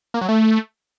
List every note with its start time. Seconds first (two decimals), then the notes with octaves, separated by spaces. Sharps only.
0.14 A#3
0.21 F#3
0.29 A3